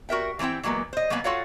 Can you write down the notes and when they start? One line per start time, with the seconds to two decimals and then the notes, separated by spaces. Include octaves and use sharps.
0.09 F#4 A#4 E5 G5
0.39 E3 A3 C4 E4 G5
0.63 E3 F#3 G#3 A#3 B3
0.93 C5 D#5
1.10 F#3 A#3 B3 B4 G#5
1.24 F4 F#4 A4 C#5 F5 F#5